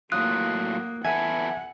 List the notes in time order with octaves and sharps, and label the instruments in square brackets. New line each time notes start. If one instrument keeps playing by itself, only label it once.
[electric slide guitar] A2 F#3 F4 [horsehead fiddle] A#3 [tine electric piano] D#6 [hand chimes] F#6
[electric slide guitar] E2 A4 B4 [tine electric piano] E5 G#5 G#6 [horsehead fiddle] F#5